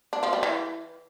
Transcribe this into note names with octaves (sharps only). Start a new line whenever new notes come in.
D4
F3
G3
E3